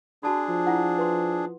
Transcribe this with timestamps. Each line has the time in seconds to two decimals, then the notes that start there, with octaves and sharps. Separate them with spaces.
0.23 D4 F#4 G#4 A5 B5
0.49 F3
0.67 E4 F#5
0.98 B4 C6